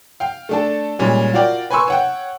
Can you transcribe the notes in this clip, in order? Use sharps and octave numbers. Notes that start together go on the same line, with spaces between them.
F5 G5
A3 D4 A4
A#2 G3 G#3 C#4
F4 F#4 A#4 D5 G5
B4 G#5 C6 C#6 E6
C#5 F#5 G5